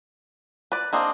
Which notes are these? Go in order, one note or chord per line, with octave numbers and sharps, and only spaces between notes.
B4 D5
A#3 C4 D4 G#4 D#5 C6